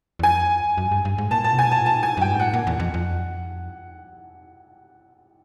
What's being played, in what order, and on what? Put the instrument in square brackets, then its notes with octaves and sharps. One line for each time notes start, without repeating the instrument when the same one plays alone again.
[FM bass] E2
[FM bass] F2 [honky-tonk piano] G#5
[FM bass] F#2
G2
G2
G#2
[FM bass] A#2 [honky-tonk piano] A5
[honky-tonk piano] A5
[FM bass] C3
[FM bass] B2 [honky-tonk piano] G#5
[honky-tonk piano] A5
[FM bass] A2
[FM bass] A#2 [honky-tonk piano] A5
[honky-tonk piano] G#5
[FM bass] F#2
[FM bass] G2 [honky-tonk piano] G5
[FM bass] G#2
[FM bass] A2 [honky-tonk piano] F#5
[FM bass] A#2
E2
F2
F2